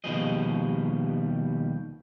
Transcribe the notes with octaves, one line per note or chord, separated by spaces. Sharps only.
D#2 B2 F3 G3 G#4 D#5